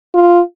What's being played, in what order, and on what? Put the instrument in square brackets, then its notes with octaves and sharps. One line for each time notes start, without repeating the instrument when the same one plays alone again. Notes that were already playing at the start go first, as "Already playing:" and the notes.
[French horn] F4